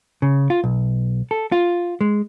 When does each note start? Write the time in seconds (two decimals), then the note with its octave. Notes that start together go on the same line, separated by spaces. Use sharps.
0.22 C#3
0.50 F4
0.64 B1
1.31 A4
1.52 F4
2.01 G#3